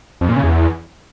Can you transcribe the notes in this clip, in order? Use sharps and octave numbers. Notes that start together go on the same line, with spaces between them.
F2
A#2
C#3
E2